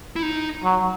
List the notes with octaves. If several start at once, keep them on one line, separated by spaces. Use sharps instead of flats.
E4
D#4
F#3